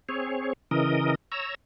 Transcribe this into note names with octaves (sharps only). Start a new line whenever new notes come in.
C4 G#4 C#5
C#3 E3 A#4 D#5
C#5 A#5 E6